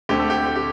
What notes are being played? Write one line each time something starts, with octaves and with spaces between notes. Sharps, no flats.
D2 D3 A3 C4 G4
A4
G4
G4
G4